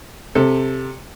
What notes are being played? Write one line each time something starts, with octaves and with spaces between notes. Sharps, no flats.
C3 A4